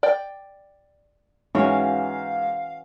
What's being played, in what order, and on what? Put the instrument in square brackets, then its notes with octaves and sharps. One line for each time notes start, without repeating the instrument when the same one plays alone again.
[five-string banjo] D5 G5
[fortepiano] G#2 [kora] E3 C#4 F#4 [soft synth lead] F5